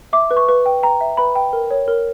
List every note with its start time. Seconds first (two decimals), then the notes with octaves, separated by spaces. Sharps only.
0.13 E5 D6
0.31 B4
0.37 C#6
0.49 B4
0.66 G5
0.83 G5 A#5
1.01 E5
1.17 B4 B5
1.35 G5
1.53 A#4
1.71 C#5
1.88 A#4